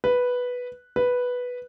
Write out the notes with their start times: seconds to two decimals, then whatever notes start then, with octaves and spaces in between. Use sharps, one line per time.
0.04 B4
0.96 B4